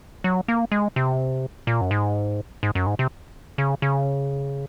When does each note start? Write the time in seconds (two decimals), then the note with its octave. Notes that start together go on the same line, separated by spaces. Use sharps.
0.24 F#3
0.48 A#3
0.72 G#3
0.96 C3
1.67 A#2
1.81 F#2
1.91 G#2
2.63 G#2
2.75 F#2
2.87 G#2
2.99 C3
3.58 C#3
3.82 C#3